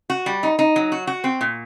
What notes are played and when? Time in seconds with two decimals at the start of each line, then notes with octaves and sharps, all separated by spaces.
0.10 F#4
0.26 G3
0.43 D#4
0.59 D#4
0.76 F#3
0.92 F#4
1.07 F#4
1.24 C4
1.41 A#2